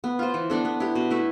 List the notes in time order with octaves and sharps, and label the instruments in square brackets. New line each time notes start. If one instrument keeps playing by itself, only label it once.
[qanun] B3
F4 C5
E3
B3 D4 A4
B3
E4 G4
B2
A3 E4 B4